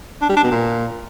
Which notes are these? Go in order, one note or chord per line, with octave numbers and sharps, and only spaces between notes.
D4
G3
D4
B2
A#2